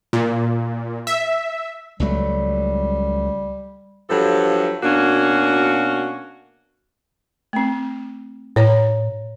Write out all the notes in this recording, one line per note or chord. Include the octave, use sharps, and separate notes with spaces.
A#2
E5
C#2 F#3 G3 A3
G2 F3 F#3 A4
B2 A#3 C#4 D4 F#4
A3 C4
A2 B4 C#5 A#5